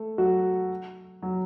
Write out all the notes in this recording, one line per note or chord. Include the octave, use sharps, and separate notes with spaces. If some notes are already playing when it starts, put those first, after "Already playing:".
Already playing: A3 A4
F#3 F#4
F#3 F#4